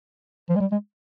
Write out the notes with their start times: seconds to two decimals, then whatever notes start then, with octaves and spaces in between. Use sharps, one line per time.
0.49 F3
0.56 G#3
0.60 G3
0.72 G#3